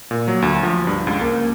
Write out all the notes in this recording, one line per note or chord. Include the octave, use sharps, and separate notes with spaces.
A#2
F#3
D2
F3
G2
C#2
A#3